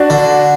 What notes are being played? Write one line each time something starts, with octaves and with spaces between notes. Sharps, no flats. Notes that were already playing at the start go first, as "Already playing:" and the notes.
Already playing: D4 F#4
D3